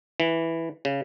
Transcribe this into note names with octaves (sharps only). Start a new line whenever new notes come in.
E3
C#3